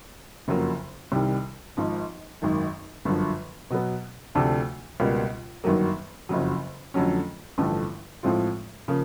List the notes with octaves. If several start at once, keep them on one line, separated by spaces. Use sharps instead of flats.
F#1 F2 C#3 F#3 A#3
C2 C3 D#3 G3
G#1 G#2 F3
G#1 F#2 D#3
G1 F#2 D3 F3
B2 F#3 B3
D2 C3 F3 A3 D4
C#2 B2 G3 A#3
G1 F#2 D#3 F#3 A#3
F#1 F2 C#3 F#3
F2 D3 F#3 A3 C#4
A1 G2 D3 F3 A3
A2 F3 G#3 C4 F4
C#3 F3 A#3